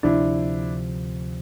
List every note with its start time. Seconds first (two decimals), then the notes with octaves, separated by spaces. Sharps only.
0.03 D2 C3 F3 D4 E4